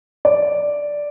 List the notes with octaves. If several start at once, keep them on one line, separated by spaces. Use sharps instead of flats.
D5